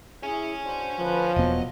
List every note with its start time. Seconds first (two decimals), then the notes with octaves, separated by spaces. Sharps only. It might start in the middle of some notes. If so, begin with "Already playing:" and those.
0.23 E4 G#4 C#5 G#5
0.65 D4 F#4 C5
0.99 D2 F3 B4
1.36 E1 A#1 E2 F#3 B3 D#5